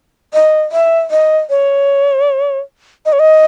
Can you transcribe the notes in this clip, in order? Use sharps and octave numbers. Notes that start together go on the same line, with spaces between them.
D#5
E5
D#5
C#5
D#5
C#5
D#5